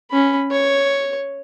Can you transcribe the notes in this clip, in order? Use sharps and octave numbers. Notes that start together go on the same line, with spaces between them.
C#4 B5
C#5